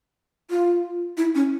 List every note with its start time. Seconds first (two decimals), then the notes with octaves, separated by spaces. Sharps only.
0.51 F4
1.17 E4
1.35 C#4